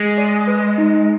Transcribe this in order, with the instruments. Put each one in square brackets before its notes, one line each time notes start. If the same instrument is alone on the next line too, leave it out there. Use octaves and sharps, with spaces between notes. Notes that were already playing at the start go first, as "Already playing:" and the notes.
Already playing: [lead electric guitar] G#3
[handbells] D5
B4
D#4